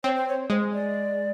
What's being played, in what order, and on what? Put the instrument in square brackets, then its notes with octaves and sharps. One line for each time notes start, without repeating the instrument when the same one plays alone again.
[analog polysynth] C4 [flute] C#5
[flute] C5
C#5
[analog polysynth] G#3 [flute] C5
[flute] D5